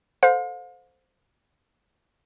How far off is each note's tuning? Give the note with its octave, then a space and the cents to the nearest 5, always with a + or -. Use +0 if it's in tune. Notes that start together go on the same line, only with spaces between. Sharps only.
A4 +0 C5 -10 F5 +40